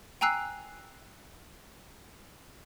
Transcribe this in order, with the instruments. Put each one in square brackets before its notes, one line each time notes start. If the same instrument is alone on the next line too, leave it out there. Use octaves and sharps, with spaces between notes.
[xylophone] G5 G#5 A#5 E6 F#6 C7